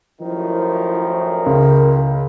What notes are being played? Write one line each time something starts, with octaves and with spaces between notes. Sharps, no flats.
F#2 A2 D#3 F3 E4
C#2 A#4